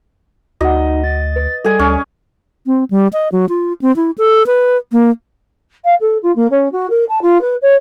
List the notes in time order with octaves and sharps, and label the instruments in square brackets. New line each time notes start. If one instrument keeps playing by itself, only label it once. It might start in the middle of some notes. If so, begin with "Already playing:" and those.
[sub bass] D2 [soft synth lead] D#4 [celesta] F#4 F#5 [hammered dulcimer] D#5
[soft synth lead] A6
[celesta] B4
[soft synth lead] G3 [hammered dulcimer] G#4 G#5 [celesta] A4
[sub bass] D2 [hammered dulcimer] C#4
[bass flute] C4
G3
D#5
F#3
F4
C4
E4
A4
B4
A#3
[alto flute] F5
A4
F4
A#3
C#4
F#4
A#4
A5
F4
B4
C#5